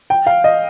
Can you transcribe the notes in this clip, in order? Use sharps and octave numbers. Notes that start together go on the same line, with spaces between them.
G5
F5
D#5